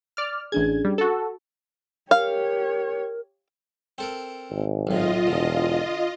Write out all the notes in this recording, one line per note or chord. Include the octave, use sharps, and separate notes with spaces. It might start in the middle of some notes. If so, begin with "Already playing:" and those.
D5 F6
A1 C#4 D4 G#4 G#6
G3
F#4 A4
G4 A#4 C#5 F5
C4 A4 A#4
G#1
B1 A2 F4 D#5
E1 D3